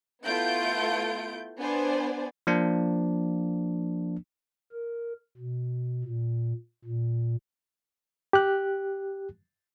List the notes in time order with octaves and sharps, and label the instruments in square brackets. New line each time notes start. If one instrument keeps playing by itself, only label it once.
[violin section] A3 B3 E4 F4 G6 D7
B3 D4 C5 D5 G#5
[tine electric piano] F3 A#3 D4
[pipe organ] A#4
B2
A#2
A#2
[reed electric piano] G4 F#6